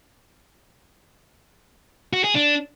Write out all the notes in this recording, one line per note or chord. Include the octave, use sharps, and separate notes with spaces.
F#4
G#4
D4